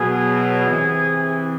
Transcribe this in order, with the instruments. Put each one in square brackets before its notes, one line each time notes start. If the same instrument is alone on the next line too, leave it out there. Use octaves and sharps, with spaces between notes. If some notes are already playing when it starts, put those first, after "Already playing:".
Already playing: [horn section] B2 F#3 G#4
C3 E3